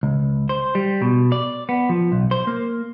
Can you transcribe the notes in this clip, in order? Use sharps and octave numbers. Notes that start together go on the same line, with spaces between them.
C#2
C5
G3
B2
D5
B3
F3
B1
C5
A#3